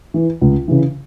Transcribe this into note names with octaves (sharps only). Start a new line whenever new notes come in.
E3
C#2
C#3 E3